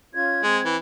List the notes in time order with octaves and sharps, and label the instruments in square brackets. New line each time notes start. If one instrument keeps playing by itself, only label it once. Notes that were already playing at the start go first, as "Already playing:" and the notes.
[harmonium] C#4 F4 [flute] G#6
[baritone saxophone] G#3 [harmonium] C4
[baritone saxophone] E3